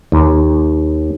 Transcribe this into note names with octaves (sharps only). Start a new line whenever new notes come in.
D#2